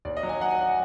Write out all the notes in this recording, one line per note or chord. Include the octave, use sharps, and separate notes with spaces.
D#2 D5
D#5
F#3
G#5
F#3 F#5
G#5
F#5